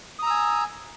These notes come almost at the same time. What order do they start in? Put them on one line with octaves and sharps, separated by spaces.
D#6 A#5 E6 G#5